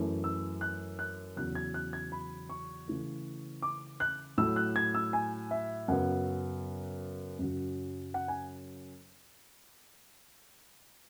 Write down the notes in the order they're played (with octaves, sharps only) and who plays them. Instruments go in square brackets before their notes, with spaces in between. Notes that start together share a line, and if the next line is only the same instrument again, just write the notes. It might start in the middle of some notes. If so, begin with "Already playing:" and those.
Already playing: [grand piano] F#2 E3 A3
E6
F#6
F#6
E2 C#3 F#3 F#6
G#6
F#6
G#6
B5
C#6
C#3 E3 A3
D6
F#6
A2 F#3 A3 E6
F#6
G#6
E6
G#5
E5
F#2 C#3 F#3 B3 F#5
F#2 C#3 F#3
F#5
G#5